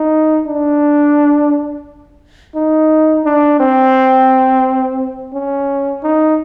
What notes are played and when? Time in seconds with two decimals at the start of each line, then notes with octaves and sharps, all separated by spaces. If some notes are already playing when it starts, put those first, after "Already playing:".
Already playing: D#4
0.47 D4
2.55 D#4
3.25 D4
3.60 C4
5.33 C#4
6.03 D#4